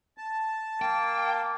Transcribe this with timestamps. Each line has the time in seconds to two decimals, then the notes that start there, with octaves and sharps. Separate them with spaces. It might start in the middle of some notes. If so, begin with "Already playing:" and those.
0.18 A5
0.82 A#3 G5